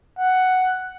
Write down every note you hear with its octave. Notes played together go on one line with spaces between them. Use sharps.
F#5